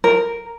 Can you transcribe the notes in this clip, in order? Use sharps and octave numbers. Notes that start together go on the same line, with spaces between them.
A#4